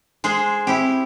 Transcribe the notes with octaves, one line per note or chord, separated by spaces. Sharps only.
G#3 G#4 C5
C4 E4 G4